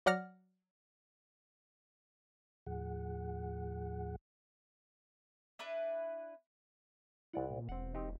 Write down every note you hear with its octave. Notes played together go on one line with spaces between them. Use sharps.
F#3 D5 F#5 F6 A#6
D#2 A2 F3 G#4 F#5
D4 E4 B4
C2 E4 D5 F#5
A#2
E1 C4 F#5
C4 D#4 G4